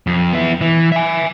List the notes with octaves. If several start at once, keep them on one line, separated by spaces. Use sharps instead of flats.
F2
B3 E4
E3
E5 G#5